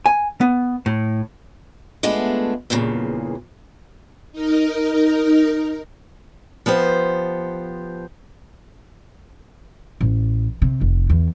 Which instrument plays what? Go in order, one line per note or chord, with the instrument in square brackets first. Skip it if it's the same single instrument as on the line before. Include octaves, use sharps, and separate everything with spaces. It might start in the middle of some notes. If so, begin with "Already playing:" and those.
[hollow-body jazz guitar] G#5
B3
A2
[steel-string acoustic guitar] G#3 A3 B3 D4 F4
E2 G2 A#2 C#3
[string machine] D#4 A#4
[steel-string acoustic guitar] F3 B3 G4 C5
[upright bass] A1
C3
F1
E2